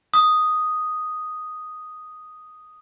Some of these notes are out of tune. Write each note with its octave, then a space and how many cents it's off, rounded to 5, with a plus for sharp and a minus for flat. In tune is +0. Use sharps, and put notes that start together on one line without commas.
D#6 +0